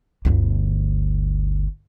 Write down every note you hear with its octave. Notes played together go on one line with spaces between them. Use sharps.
G1 D2